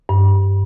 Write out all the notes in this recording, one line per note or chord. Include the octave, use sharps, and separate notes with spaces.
G2